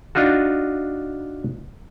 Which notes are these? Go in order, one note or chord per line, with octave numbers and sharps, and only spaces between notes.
D4 D#4 F4 F#4